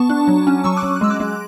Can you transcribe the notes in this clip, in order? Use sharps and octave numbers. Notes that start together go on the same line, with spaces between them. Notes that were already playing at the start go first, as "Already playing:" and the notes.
Already playing: B3 A5 C#6
D4
F#3
C#4
F#3 C#6 E6
D6 F#6
F#3
F#6
G#3 E6
D6 F#6
G#3